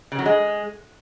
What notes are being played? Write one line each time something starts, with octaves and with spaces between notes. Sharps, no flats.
C#3
F#3
G#3